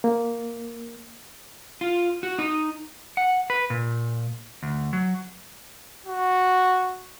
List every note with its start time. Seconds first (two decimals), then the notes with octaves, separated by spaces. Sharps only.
0.04 A#3
1.81 F4
2.23 F#4
2.39 D#4
3.17 F#5
3.50 B4
3.70 A#2
4.63 D2
4.93 F#3
6.06 F#4